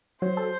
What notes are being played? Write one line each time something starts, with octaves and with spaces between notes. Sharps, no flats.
F#3 C5
A4